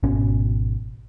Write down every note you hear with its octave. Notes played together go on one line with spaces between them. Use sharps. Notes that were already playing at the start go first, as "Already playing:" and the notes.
G#1 B2 C#4